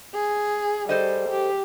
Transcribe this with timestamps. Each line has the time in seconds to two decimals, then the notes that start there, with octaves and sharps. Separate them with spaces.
0.14 G#4
0.89 G3 A4 C5 D#5
1.29 G4